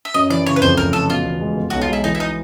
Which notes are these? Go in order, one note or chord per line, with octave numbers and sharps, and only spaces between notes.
E5
F#2 D#5
E3 D5
C#3 C#5
B4
F2 C5
F1 A#4
C#3 A4
B2 F4
E2
G#3
B2
B1 F#4
F4
G#3 E4
E3 D#4
E4
D#4